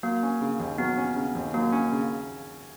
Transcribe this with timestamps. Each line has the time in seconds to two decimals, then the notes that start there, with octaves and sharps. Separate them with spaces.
0.03 F#3 A#3
0.23 C#4
0.41 C#3
0.60 D#2
0.78 F#3 B3
0.97 C#4
1.16 C#3
1.35 D#2
1.54 F#3 A#3
1.72 C#4
1.92 C#3